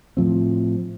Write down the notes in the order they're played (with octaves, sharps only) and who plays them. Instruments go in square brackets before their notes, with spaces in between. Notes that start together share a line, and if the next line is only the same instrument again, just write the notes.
[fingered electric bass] A2 F3 C4